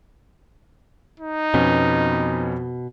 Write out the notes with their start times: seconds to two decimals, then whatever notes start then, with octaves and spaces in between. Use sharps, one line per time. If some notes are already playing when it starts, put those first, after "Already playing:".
1.20 D#4
1.54 F2 B2 B3 C#4